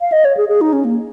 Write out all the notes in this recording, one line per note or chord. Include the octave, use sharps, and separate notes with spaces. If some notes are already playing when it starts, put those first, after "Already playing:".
F5
D#5
C#5
G#4
G#4
D#4
C#4
A#3